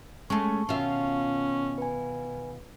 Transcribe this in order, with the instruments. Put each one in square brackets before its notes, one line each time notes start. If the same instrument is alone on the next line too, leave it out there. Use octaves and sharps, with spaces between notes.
[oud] G#3 A3 [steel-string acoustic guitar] C#4 [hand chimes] A5 C#6
[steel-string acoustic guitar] B2 D#3 F5 [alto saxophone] C#4 [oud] F4 E5
[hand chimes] B4 G#5